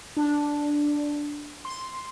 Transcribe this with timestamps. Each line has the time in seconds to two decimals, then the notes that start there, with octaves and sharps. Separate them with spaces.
0.17 D4
1.65 C6